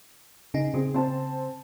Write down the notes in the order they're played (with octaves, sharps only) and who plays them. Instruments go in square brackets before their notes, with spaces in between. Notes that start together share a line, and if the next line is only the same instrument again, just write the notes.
[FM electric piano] C#3 D#4
[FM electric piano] C#3 [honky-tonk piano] C4 G#4
[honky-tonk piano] C4 C5 A5